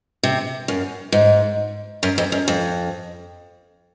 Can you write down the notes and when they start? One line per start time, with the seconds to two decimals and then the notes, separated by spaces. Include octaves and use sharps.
0.23 C3
0.68 F#2
1.12 G#2
2.03 F#2
2.18 F2
2.32 F#2
2.48 F2